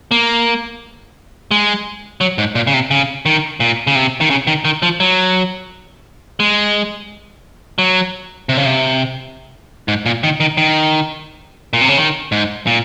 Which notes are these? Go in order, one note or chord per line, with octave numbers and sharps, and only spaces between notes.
A#3
G#3
F#3
G#2
A#2
C#3
C3
C#3
D#3
A#2
C#3
C3
D#3
C#3
D#3
D#3
F3
F#3
G#3
F#3
C3
C#3
C3
G#2
A#2
D#3
D#3
D#3
A#2
C3
C#3
D#3
G#2
A#2